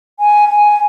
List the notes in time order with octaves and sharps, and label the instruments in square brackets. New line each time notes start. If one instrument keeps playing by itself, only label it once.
[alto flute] G#5
G#5